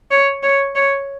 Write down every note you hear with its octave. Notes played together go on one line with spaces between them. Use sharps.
C#5
C#5
C#5